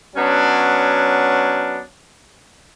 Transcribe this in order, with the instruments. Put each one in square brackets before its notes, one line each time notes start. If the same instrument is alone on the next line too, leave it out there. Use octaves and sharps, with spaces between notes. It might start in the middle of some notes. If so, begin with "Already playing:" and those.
[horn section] F#3 B3 C#4 D4